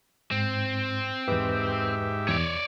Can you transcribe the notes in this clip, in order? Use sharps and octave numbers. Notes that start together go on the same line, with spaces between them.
G#2 C4
E2 G#2 G4 B4 E5
E2 C#5 D5